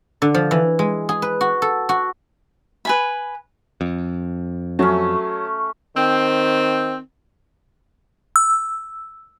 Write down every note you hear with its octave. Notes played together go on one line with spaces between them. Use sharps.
D3
F3
E3
G#3
G#4
B4
F#4
A4
F#4
B4 G#5 B5
F2
F#3 A3 C#4
D#3 C4
E6